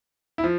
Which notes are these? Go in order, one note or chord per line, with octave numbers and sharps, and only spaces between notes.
E4
F3